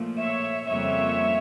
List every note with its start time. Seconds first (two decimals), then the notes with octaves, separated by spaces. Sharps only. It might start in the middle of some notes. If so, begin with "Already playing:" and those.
Already playing: A#2 F3 A3
0.19 C#5 E5
0.67 F2 C#3 G3 A#3 C#5 E5